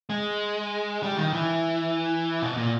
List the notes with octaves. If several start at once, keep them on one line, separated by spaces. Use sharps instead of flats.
G#3
G3
D#3
E3
B2
A#2